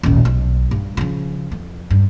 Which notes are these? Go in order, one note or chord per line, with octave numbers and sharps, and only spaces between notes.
D#1 A1
B1
G2
C#3 F3
F2
G2